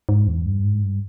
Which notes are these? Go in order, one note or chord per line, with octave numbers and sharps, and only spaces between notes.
G#2
E2
G2
G#2
G2